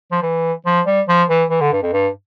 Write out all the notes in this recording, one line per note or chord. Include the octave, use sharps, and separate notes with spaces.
F3
E3
F3
G3
F3
E3
E3
D3
G2
F2
G2